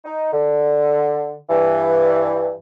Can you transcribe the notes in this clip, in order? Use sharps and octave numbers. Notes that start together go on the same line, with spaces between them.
D#4
D3
G2 E3